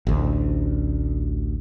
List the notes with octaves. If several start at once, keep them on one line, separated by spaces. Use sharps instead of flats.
A1 D2